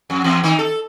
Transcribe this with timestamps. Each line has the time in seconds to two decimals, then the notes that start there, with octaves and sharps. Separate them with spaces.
0.10 F2
0.24 E2
0.43 D#3 D#4
0.59 A4